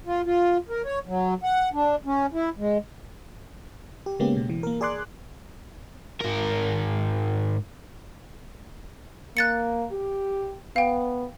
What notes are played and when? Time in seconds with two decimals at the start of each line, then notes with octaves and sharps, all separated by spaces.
0.06 F4
0.25 F4
0.69 A#4
0.85 C#5
1.07 F#3
1.43 F#5
1.73 D4
2.06 C#4
2.33 E4
2.58 G#3
4.06 G4
4.20 C#3 G#3 A#3 B3 C#4 G4
4.37 B2
4.50 E3
4.63 A#3 A#4
4.81 G#4 D5 G#5 C6 D6 F#6
6.21 G#2 A#4
9.37 A#3 F#6 A6 C#7
9.92 G4
10.76 B3 F5 G5